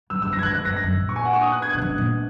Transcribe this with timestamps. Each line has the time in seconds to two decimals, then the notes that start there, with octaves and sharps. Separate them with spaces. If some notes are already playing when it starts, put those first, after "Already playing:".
0.10 F#2 E6
0.22 G#2 E6
0.32 F#2 A#6
0.39 G#6
0.43 G#2 F#6
0.54 G#2 F#6
0.65 F#2 A#6
0.75 E2 A#6
0.83 F#2
0.92 G#2
1.00 A#2
1.09 C#6
1.16 G#5
1.25 F#5
1.33 C#6
1.41 D#6
1.52 F#6
1.62 G#6
1.73 B2 F#6
1.81 C#3
1.89 B2
1.98 A#2